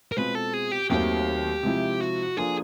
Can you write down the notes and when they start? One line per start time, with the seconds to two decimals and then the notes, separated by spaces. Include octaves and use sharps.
0.12 A#4
0.17 B2 G#3 C4 F4 B4
0.35 A4
0.54 G#4
0.71 G4
0.90 D#2 D#3 F#3 A3 C4 G4
1.63 C3 F3 G#3 C4 E4
2.01 F#4
2.37 F3 A#3 D4 F4 G#4 A4